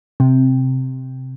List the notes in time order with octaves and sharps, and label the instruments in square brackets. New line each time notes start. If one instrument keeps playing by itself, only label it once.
[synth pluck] C3